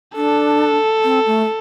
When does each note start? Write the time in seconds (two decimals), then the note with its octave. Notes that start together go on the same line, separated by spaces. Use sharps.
0.16 D4 A4
1.04 C4
1.26 A3